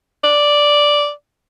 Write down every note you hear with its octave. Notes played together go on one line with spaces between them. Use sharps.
D5